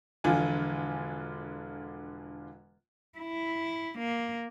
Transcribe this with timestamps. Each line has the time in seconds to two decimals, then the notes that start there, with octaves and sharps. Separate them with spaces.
0.24 E1 D3 E3 F3 F4 G#5
3.19 E4
3.98 A#3